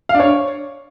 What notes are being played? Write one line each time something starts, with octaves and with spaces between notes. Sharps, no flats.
F5
D4
C#5